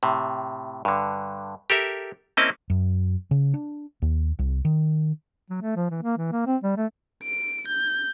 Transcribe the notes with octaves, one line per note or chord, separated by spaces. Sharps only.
A2 C3
G2 D3
G4 A4 A#4 E5
A#3 C4 C#4 E4 D#5 A5
F#2
C#3
D4
D#2
C2
D#3
F#3
A3
F3
E3
A#3
E3
A#3
C4
G3
A3
D7
G6